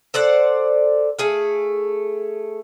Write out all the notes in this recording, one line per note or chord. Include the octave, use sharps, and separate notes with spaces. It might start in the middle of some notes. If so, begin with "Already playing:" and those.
A4 C5 D5 F#5
A3 G#4 F5